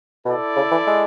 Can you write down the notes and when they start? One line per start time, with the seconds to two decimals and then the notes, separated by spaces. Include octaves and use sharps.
0.25 B2 E4 A4 D5
0.57 C#3
0.71 E3
0.87 G#3